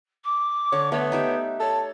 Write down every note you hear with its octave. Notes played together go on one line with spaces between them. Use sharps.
D6
D3 C#5
A3 B3 C#5
D#4 G4 E5
A4 C#5